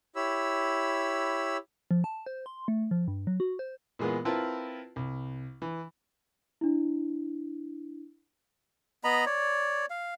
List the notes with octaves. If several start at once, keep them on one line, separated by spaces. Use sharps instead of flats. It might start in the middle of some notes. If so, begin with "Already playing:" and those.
E4 G4 C#5 B5 E6
F3
A5
C5
C6
A3
F3
G2
F#3
F#4
C5
A#2 E3 G#3 A#3 B3
C4 E4 F4 A#4 B4 A5
C2
E3
D4 E4
B3 D#5 A#5 B5
C#5 D5
F5